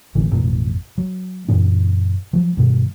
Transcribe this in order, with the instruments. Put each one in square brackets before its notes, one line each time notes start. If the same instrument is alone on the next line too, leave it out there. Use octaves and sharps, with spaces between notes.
[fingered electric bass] A1 D3 E3
A1 F2 B2
F#3
F#2 A#2 E3 D4
F3 F#3
G2 B2 D#3